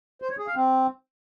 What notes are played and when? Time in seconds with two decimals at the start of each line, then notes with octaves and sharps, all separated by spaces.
0.22 C5
0.30 C#5
0.39 G#4
0.47 F5
0.55 C4